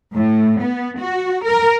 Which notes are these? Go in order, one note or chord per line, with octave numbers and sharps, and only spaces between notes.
A2
B3
F#4
A#4